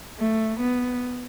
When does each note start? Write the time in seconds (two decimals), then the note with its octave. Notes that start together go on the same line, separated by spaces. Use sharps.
0.19 A3
0.60 B3